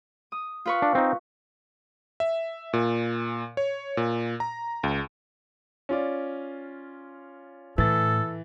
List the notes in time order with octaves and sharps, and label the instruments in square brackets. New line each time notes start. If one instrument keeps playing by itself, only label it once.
[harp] D#6
F4 B4 C#6
[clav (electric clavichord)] D4
C4 D#4
[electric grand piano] E5
A#2
C#5
A#2
A#5
C#2
[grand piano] C#4 F4 D5
[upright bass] A2 [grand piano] E3 A6 [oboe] A4